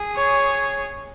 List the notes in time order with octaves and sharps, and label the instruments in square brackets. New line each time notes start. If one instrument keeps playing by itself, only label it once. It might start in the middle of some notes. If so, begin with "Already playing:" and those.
Already playing: [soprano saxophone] G#4
[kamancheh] C#5